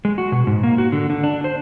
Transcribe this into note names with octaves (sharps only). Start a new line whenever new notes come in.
G#3
F#4
B2
G#2
A#3
F#4
D3
D3
D4
C5